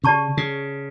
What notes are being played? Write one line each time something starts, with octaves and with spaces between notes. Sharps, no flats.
C#3 G4 D5 A5 C#6
C#3